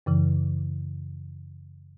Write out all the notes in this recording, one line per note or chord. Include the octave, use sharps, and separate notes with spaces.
F#2 C#3 E3